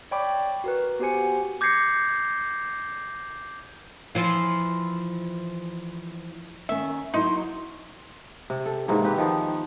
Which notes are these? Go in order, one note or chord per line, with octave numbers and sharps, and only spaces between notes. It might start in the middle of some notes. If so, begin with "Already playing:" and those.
C#5 D5 G5 B5 C#6 D6
F#4 A#4 B4
B3 F#4 G4 C5 G#5 C#7
D6 G6 G#6 A#6 C7 C#7
E3 F3 F4
D#3 A#3 C#4 E5
F#3 A#3 D#4 E4 C6
C3
A4
G#2 C3 E3 A#3
C4 G4 B4
D#3 F3 B3